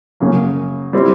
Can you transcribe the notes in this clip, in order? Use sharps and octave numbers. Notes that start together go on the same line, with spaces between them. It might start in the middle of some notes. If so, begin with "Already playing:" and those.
F#2 C#3 F#3 A#3
G3 C4 E4